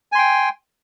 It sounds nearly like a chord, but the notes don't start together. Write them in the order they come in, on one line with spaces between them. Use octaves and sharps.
G#5 C6 G5